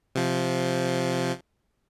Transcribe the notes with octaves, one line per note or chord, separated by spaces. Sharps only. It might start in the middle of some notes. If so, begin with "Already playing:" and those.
C3 F3